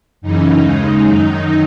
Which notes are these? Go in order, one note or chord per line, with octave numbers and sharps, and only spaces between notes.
F#2 C#3 E3 D#4
D#2 C#3 G#3 D#4
F#2 D#3 F#3